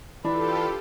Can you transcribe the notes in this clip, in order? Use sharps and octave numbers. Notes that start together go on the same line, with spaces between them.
E3 D4 F4 G4 A4 B4